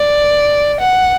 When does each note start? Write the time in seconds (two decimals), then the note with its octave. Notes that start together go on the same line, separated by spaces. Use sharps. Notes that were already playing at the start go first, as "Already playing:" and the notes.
Already playing: D5
0.81 F#5